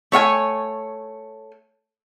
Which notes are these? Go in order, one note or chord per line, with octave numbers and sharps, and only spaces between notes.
A3 C#5 F5 G#5